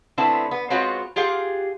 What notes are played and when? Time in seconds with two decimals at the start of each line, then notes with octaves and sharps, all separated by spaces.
0.18 D3 A3 B3 C4 E4 A5
0.51 B3
0.70 G#3 B3 C4 F4 F#4 C#5
1.16 F4 G4 G#4 F5 F#5